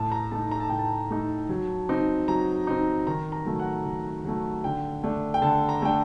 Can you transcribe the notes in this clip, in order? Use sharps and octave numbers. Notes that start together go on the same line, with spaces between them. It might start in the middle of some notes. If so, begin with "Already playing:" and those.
Already playing: A2 A5
A#5
A3 D#4 A5
A#5
A5
A2 G5
A5
A3 D#4
F#3
C4 D#4
F#3 A#5
C4 D#4
D#3 A#5
A#5
F#3 A3
F#5
D#3
F#3 A3
D3 G5
A3 D4
G5
D3 A5
A#5
A3 D4 G5